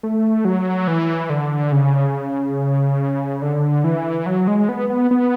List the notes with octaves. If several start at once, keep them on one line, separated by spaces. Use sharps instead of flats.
A3
F#3
E3
D3
C#3
D3
E3
F#3
G#3
B3
B3
B3